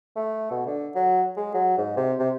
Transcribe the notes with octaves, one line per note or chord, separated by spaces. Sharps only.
A3
B2
D3
F#3
G#3
F#3
G#2
C3
C3